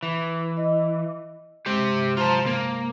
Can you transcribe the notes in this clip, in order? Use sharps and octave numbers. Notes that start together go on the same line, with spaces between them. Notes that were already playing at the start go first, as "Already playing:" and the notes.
E3
D#5
G2 C3 G#3 G4 C5
F4 C5 A5 A#5 C6
A#3